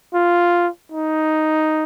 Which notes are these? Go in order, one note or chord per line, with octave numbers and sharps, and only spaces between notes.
F4
D#4